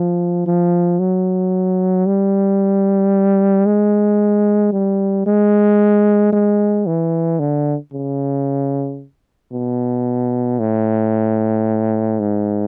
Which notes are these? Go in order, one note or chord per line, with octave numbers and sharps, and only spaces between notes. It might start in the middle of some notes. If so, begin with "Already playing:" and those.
Already playing: F3
F3
F#3
G3
G#3
G3
G#3
G#3
E3
D3
C#3
B2
A2
G#2